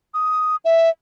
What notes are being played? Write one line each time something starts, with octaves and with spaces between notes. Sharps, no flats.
D#6
E5